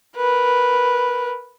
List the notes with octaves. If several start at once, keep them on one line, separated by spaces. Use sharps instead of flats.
A#4 B4